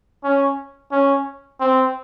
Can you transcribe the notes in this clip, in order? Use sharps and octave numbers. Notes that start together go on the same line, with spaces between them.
C#4
C#4
C4